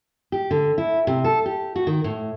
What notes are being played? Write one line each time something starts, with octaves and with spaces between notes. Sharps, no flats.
G4
D3
E4
C3
A4
G4
F#4
D#3
A2